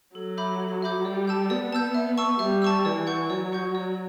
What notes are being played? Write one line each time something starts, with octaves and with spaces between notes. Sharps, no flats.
F#3 A4
E5 B5 D6 G6
A4
E5 B5 D6 G6
G3 D5
A5 E6 G6
B3 D5
A5 E6 G6
E5
A5 C#6 E6
G3 E5
A5 C#6 E6
E3 D5
F#5 C#6 G6
F#3 D5
F#5 C#6 G6
D5